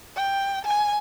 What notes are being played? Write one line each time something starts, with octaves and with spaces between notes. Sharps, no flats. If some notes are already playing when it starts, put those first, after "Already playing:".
G5
G#5